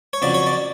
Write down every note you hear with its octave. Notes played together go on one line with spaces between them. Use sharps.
C#5
F2 C#3 F#3 D5
C#5
D5